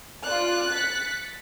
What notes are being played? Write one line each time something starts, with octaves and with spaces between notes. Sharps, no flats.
F4 D5 F#6
A6 B6 C#7